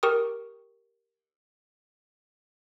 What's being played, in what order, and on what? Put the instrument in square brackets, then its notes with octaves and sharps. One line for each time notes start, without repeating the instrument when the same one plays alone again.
[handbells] G4 A#4 G5 C#6 D#6